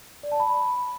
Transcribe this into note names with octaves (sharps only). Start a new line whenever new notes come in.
D5
A5
B5